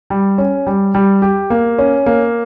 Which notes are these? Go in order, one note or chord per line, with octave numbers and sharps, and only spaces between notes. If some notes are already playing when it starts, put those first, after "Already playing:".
G3
C#4
G3
G3
G4
A#3
C#4
A#3